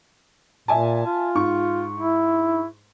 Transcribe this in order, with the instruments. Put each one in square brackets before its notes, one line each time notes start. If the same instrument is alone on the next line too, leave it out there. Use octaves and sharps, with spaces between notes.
[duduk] A#2 [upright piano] E5 G#5 A5
[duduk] F4
[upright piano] G#2 C#6
[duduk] E4